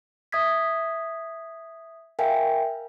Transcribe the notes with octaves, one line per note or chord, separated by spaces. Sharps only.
E5 D#6 G#6 B6
A#4 E5 F5 G5 G#5